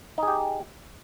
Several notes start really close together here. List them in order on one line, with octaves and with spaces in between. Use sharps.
D#4 G#4 G4